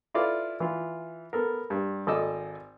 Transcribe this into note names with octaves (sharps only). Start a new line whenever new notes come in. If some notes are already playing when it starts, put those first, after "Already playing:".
E4 F4 A4 B4 D5 F5
E3 F4
B3 A4 A#4
G2
G#1 A4 D5 D#5 E6